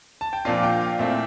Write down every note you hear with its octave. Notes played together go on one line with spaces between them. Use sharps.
A5
G5
A#2 F3 A#3 D4 F4 F5
G5
F5
A#2 A3 C4 E4 E5